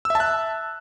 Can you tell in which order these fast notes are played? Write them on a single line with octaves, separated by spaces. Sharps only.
E6 E5 A5 F#6